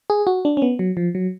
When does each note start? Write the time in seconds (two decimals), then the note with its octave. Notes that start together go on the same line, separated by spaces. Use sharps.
0.10 G#4
0.27 F#4
0.45 D4
0.57 C#4
0.62 B3
0.79 F#3
0.97 F3
1.15 F#3